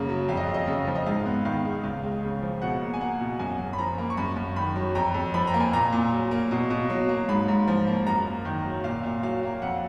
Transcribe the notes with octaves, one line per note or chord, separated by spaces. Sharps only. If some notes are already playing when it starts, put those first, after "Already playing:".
Already playing: F#2 C#3 A#3
F#3
F2 F5
D#5
F2
D#5
C#3
F3
D#5
G#2 F5
B3
D#3 F5
G#3
C#2 F5
G#3
C#3
F3
B2 F#5
A#3
G#5
A#3 F#5
B2
F#2 G#5
F#2
B5
F3 A#5
A#3
C#6
F#2 B5
F#2
D#3 B5
F#3
F2 A#5
F2
F3 B5
A#5
A#3
G#5
A#2 A#5
A#2
F#3
A#3
B2
B2
F#3
A#3
G#2 B5
G#2
F3
A#3
F#2 A#5
A#3
D#3
F#3
A#2 F5
A#2
F#3 F5
A#3
F2 F#5